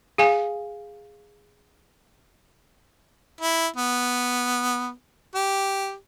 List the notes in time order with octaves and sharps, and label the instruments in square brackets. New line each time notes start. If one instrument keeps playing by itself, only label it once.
[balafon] G#4 F5 G#5
[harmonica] E4
B3
G4